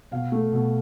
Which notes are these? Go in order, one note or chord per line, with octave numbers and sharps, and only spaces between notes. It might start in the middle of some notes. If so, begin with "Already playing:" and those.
B2 F5
A3
B2